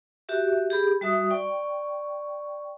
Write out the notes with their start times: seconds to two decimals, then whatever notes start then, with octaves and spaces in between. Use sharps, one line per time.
0.29 F#4 G4 E5
0.70 G4 G#4 B5
1.01 G3 F#4 E5 D#6
1.31 D5 G5 C#6